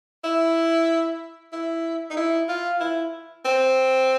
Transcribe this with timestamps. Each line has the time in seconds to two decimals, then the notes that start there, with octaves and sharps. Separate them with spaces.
0.24 E4
1.52 E4
2.11 D#4
2.17 E4
2.49 F4
2.80 E4
3.45 C4